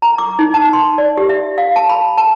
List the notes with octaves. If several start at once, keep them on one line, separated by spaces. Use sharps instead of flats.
A#5
D6
D#4
A5
C6
D5
G4
E5
F5
A5
B5
A5